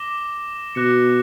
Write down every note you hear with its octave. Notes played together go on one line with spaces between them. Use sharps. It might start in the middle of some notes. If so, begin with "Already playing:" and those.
Already playing: D6 A#6 E7 G7
B2 D6 F#6 A#6 C#7